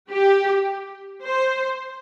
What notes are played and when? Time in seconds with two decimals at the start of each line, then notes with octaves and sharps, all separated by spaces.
0.10 G4
1.21 C5